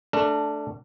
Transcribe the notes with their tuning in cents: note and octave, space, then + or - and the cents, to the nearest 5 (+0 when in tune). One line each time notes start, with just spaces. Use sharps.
A3 -10 D4 +0 A#4 -40